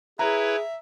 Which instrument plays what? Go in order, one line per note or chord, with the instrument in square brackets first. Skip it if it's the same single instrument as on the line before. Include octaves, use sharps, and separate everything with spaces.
[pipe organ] E4 B4 C#5 [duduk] G#4 [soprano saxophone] E5 [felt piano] A#5